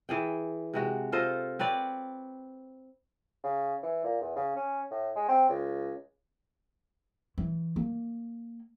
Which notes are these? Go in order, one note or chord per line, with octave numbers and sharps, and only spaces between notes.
E3 G#4 G5
C3 G#3 F#4
F4 A4 C5 D#5
C4 B4 C#5 D5
C#3
E3
A#2
E2
C#3
C#4
A2
G#3
C4
C#2
E3
A#3